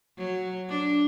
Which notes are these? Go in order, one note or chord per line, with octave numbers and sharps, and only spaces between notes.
F#3
D4